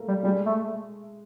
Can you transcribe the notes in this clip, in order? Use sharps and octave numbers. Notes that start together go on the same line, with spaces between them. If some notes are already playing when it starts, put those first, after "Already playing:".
Already playing: A3 A#3
G3
G3 G#3
A3